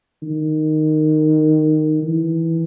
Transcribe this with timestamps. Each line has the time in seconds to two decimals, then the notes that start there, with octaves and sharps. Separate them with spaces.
0.23 D#3
2.02 E3